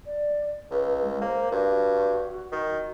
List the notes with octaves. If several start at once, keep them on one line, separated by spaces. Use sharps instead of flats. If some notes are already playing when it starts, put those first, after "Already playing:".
D5
C#2 B4
G#3
A#3 C5
G2 F#4
D#3